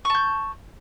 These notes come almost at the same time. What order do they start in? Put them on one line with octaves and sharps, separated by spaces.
C#6 A5 G6